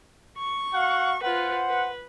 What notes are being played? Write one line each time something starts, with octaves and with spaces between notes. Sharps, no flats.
C#6
F#4 F5 F#5
F4 B4 C5 F#5
B4